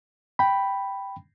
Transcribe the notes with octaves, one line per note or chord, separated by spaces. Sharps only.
G5 B5